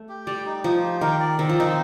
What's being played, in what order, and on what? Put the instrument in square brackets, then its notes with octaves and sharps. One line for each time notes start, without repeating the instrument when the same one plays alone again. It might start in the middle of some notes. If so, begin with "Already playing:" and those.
Already playing: [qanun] A3
[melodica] G4
[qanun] G3 [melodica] D5
[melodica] D#4
[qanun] F3 [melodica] D#4
[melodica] G4
[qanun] D#3 [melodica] A#4
[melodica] D5
[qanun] D#3 [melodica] C4
[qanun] F3
[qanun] D#3 [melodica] D#4